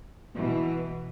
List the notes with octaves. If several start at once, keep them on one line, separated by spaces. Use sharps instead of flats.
B2 E3